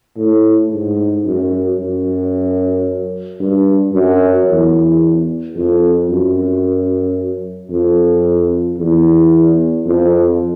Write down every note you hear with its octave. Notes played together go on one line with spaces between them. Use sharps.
A2
G#2
F#2
F#2
G2
F#2
E2
F2
F#2
F2
E2
F2